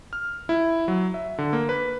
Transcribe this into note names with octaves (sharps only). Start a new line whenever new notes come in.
F6
E4
F#3
E5
D3
A#3
B4